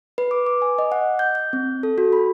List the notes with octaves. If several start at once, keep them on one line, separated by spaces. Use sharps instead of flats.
B4
D6
D6
G#5
D#5
F#5
G6
G6
C4
A4
F#4
B5